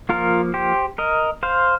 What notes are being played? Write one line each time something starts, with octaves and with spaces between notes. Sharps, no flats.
F3 A#3 F4 A#4
G4 C5
A#4 D#5
C5 F5